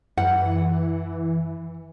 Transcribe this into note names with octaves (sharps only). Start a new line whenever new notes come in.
F#2 E3 F#5